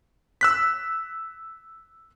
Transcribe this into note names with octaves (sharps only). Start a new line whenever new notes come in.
E6 F#6 B6